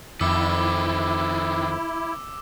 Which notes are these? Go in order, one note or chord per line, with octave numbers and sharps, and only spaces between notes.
F2 D#3 E3 E4 D6 E6